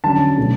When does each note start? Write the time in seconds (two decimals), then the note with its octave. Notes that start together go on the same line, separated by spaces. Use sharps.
0.04 D3 F#3 C#4 A5
0.37 B2 F#3 A3